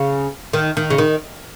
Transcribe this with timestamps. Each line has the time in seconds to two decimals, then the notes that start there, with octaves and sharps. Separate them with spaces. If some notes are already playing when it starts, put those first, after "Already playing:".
Already playing: C#3
0.53 D#3
0.77 D#3
0.90 C#3
0.98 D#3